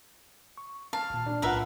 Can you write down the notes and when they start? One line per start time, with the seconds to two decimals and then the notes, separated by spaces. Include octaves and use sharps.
0.57 C#6
0.93 F5 A5
1.10 G#1 A#2
1.26 D4
1.42 B1 A2 F4 A#4 B4 E5 F#5 A#5